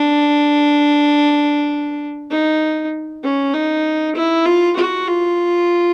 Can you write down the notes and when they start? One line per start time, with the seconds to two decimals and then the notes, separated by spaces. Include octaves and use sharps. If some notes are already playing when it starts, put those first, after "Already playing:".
Already playing: D4
2.31 D#4
3.23 C#4
3.54 D#4
4.15 E4
4.45 F4
4.76 F#4
5.07 F4